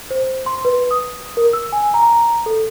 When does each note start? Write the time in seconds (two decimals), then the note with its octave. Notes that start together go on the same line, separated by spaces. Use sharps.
0.11 C5
0.46 C6
0.65 B4
0.91 D#6
1.37 A#4
1.53 E6
1.73 G#5
1.94 A#5
2.46 A4